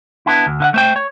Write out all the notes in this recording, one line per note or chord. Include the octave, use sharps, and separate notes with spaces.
B3 D4 E4
D2
D3 F5 F#5
A3 C5 G5
C#5